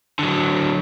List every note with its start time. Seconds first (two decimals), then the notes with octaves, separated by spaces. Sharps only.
0.19 D3 F#3